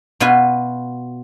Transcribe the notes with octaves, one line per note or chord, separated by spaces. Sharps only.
B2 B3 F4 B4 G#5